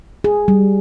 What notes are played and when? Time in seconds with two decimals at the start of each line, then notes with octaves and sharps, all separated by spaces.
0.24 G#4
0.48 G3